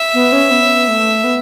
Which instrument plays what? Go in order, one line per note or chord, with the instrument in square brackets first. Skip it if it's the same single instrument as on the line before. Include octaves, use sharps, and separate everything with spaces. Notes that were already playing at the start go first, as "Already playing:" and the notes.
Already playing: [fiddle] E5
[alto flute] B3
C#4
B3
A3
B3